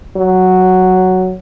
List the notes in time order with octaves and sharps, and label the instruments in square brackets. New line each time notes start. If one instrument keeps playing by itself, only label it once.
[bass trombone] F#3